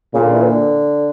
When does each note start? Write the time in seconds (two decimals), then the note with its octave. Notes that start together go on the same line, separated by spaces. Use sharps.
0.14 A#2 C#3
0.23 D3
0.33 E3
0.44 D3